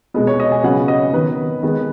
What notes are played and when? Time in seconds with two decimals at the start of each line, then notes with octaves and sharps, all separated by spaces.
0.14 B2 G#3 B3 D#5
0.27 C#5
0.40 D#5
0.52 G#5
0.63 C#3 F#3 B3 F#5
0.88 D#5
1.13 D#3 B3 B4
1.63 D#3 G#3 B3